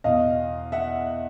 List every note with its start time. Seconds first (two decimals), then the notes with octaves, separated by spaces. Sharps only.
0.04 E2 B2 D#5 F5
0.72 E5 F#5